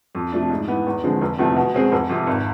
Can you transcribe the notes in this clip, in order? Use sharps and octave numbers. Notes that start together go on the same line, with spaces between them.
F2
C3 F3 A3 D4
G#2
E3 B3
E2
D3 F3 G#3 C4
F1
E2 C3 F3 A3
B2
G#3 C4 G#4
F1
F2 C3
G#1